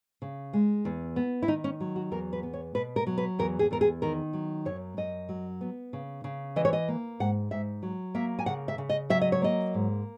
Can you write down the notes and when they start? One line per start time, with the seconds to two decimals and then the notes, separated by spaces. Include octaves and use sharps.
0.22 C#3
0.53 G#3
0.85 E2
1.16 B3
1.42 E4
1.48 D#3 D#4
1.64 C#4
1.80 F#3
1.96 F#4
2.11 E2 A#4
2.33 B4
2.43 B3
2.54 C#5
2.75 B2 B4
2.96 A#4
3.07 F#3
3.18 B4
3.39 E2 A#4
3.59 G#4
3.71 E2 A#4
3.81 G#4
4.02 D#3 A#4
4.33 F#3
4.65 F#2 C#5
4.97 F#2 D#5
5.29 F#3
5.61 B3
5.93 C#3
6.24 C#3
6.56 E3 D#5
6.65 C#5
6.73 D#5
6.88 A#3
7.20 G#2 F#5
7.51 G#2 E5
7.83 F#3
8.15 A#3 E5
8.39 G#5
8.46 C#3 F#5
8.68 E5
8.78 C#3
8.89 D#5
9.10 F#3 E5
9.21 D#5
9.32 C#5
9.42 A#3 D#5
9.74 G#2